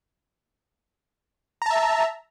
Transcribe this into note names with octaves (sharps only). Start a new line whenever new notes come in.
E5 A5 A#5